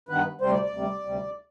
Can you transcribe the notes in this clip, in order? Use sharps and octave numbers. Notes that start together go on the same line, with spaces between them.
G2 D#3 B3 B4
D2 C3 G3 C5
D5
D5
D2 C3 G3
D2 C3 G3